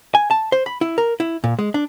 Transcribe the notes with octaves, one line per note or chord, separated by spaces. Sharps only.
G#5
A5
C5
B5
E4
A#4
E4
A#2
G#3
D4